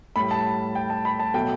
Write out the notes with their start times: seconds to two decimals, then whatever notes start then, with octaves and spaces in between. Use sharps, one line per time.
0.16 A2 G3 B5
0.31 A5
0.75 G5
0.90 A5
1.05 B5
1.20 A5
1.34 B2 F#3 A3 G5